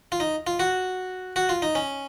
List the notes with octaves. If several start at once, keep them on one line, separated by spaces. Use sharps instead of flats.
F4
D#4
F4
F#4
F#4
F4
D#4
C#4